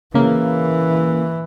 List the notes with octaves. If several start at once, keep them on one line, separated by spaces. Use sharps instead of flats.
C#3 E3 A#3